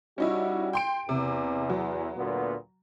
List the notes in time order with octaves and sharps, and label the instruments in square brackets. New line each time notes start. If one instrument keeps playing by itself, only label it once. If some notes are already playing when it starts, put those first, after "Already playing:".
[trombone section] G3 F#4 [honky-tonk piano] C#4 D#4 E4
[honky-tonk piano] G5 C6 D7
[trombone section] E2 [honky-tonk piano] C3
[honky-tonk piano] F#3
[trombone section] D2 A#2 B3